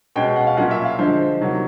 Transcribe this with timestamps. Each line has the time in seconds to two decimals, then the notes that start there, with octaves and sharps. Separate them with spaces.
0.16 B2 G#3 C#4 G5
0.36 F#5
0.47 F5
0.57 A#2 F#3 A#3 C#4 F#5
0.71 E5
0.85 F5
0.98 D3 F3 G#3 C5
1.41 C3 D#3 F#3 A#3